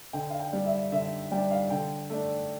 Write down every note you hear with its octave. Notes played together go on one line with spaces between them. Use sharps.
D3 G5
F5
G5
G3 D4
E5
D3 E5
G3 D4 G5
F5
D3 G5
A3 D4